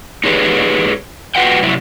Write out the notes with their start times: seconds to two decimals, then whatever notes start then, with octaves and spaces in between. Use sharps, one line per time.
0.24 D#4 F4 G4 G#4 B4 C#5
1.35 F4 F#4 B4 F#5 G5
1.63 C3 F#3 E4